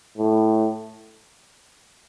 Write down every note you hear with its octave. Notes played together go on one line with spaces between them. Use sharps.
A2